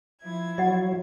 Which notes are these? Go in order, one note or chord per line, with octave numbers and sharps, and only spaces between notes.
F3 E4 G#6
F#3 D#5 F#5